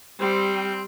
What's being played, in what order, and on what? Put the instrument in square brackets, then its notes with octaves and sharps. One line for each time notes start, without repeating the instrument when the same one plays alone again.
[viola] G3 [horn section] C4